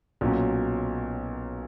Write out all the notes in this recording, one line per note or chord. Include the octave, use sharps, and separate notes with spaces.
B1 A#2 F#3 C#4